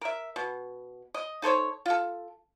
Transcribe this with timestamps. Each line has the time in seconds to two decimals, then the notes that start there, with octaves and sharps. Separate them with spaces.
0.01 A#4 E5
0.36 B2
1.14 D#5
1.42 D#4 A4 C5 C#5
1.86 F4 A4